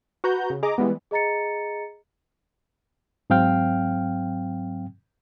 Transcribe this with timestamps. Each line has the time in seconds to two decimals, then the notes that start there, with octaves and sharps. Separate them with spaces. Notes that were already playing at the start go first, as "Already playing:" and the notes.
0.24 F#4 B4 A#5 G6
0.50 C#3
0.63 G#4 D#5 A#5 D6
0.78 E3 G3 G#3 B3
1.11 G#4 D#5 A#5 A6 C#7
3.30 G#2 F#3 C4 F5 G5 F6